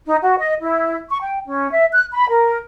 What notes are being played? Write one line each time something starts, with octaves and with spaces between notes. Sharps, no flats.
D#4
F#4
D#5
E4
C#6
G5
C#4
E5
F#6
B5
A#4